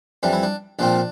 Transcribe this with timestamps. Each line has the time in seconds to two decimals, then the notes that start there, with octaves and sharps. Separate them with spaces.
0.23 F2 E3 G3 D4
0.33 E4
0.43 D4
0.79 A#1 A#2 F3 C4 D4